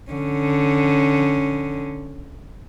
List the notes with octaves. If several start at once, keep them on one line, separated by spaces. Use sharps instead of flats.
D3 C#4